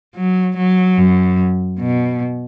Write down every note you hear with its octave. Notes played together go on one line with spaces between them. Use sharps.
F#3
F#3
F#2
B2